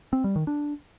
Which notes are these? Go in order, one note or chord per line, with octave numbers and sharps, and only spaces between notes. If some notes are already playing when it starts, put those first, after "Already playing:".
C4
G3
D#3
D4